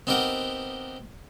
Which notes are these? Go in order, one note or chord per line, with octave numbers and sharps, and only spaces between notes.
B3 C4 D#4 G4 A#4 F#5